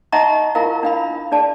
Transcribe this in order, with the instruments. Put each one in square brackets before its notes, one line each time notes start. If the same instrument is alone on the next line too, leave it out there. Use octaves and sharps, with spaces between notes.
[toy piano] D#4 D#5 E5 F#5 A#5 C#6
E4 F4 A#4 F5 A#5
D4 F5 B5
D4 G#4 D5 A5